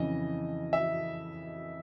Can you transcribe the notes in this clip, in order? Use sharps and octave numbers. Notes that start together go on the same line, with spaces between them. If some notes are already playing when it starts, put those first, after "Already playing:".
Already playing: F2 C#3 E3 D#5
E5